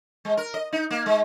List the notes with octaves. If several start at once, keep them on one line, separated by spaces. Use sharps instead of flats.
G#3
A#4
D#5
D#4
A#3
G#3